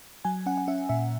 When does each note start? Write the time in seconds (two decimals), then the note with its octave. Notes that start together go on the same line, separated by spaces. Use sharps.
0.25 F#3 G#5
0.46 C#4 F#5
0.58 F#5
0.68 C#4 E5
0.89 A#2 E5